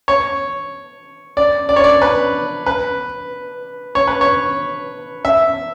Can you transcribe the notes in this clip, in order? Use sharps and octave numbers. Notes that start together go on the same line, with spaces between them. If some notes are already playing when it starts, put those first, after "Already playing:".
C#5
D5
D5
C#5
D5
B4
B4
C#5
B4
C#5
E5